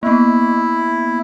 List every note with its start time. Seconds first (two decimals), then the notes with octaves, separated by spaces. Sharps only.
0.03 A#3 B3 E4